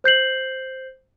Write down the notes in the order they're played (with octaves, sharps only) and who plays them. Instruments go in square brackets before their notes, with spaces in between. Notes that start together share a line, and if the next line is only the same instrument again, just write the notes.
[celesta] C5 G6 C7 F#7